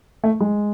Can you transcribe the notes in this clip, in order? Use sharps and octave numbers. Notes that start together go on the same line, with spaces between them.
A3
G#3